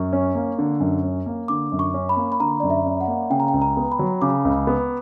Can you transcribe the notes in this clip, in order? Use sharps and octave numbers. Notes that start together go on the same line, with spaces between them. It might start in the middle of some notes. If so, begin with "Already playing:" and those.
Already playing: F#2 C#6
C#4
A#3
D3
F#2
C#4
A#3
D3 D6
F#2
C#6
C#4
B5
A#3
B5
D3 A#5
F#2 D5
E5
C#4
F#5
A#3
C#3 G5
A#5
G5
C#2
A#5
B3
B5
F#3
C#3 D6
C#2
B3